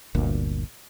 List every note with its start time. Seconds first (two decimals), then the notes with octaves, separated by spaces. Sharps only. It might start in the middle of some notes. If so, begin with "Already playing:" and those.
0.15 G1 D2 A#2